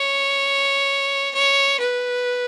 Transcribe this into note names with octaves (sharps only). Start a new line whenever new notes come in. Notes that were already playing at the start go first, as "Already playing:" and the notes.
Already playing: C#5
C#5
B4